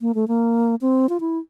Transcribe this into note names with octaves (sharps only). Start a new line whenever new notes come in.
A#3
A3
A#3
C4
F4
E4